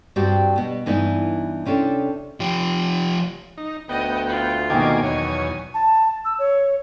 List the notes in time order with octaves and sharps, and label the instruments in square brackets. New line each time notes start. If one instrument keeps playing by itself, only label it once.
[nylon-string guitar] G2 C4 F#4 G4 D5
B2 B3
G2 E3 B3 D#4 E4
C3 C#4 D4 A4
[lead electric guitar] F3 G4
[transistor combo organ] D#4
[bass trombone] D2 [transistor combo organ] B3 G5 [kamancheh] D#5
[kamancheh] F4
[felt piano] B2 D#3 [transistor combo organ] A#3 G#5 D6
[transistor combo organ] E2 C#5 [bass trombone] F#3 [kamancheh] G#5
[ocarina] A5
E6
C#5